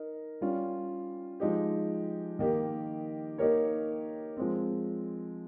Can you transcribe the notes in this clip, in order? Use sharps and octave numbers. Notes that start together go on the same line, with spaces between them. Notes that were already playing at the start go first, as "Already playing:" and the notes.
Already playing: D#4 A#4
G3 C#4 F4
F3 G#3 D#4 G4
D#3 A#3 D#4 G4
A#3 D#4 G4 A#4 C#5
F3 G#3 C4